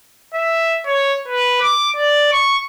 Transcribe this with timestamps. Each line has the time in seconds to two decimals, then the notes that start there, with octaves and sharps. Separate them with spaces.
0.34 E5
0.86 C#5
1.28 B4
1.62 D6
1.97 D5
2.32 C#6